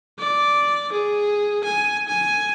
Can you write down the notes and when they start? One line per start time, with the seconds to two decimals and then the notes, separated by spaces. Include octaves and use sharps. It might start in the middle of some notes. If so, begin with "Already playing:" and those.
0.19 D5
0.92 G#4
1.64 G#5
2.08 G#5